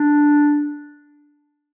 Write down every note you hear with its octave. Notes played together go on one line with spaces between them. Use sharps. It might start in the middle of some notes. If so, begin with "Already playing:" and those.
Already playing: D4